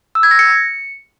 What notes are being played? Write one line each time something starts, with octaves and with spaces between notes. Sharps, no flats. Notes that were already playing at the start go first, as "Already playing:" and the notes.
E6
G#6
A#6
C#7